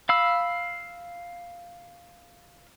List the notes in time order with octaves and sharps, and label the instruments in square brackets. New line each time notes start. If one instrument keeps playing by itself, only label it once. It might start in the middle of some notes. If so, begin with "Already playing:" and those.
[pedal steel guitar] F5 B5 E6